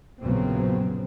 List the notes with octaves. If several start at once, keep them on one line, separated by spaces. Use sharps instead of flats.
A#1 F#2 C#3 F#3 B3 C4